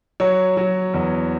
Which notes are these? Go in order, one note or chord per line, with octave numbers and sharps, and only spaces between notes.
F#3 C#5
F#3
E2